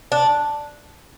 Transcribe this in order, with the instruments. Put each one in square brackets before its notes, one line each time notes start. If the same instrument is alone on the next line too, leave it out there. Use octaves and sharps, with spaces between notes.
[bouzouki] D4